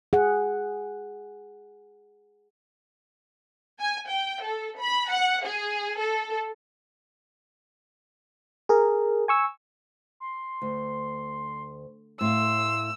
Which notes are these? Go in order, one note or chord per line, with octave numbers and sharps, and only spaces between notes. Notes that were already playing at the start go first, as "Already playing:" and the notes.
G#4 F#5
G#5
G5
A4
B5
F#5
G#4
A4
G#4 A#4
G#5 C#6 E6
C6
D2
A2 F5 C6 E6